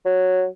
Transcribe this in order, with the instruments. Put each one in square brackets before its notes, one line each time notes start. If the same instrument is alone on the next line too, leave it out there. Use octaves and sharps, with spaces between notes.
[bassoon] F#3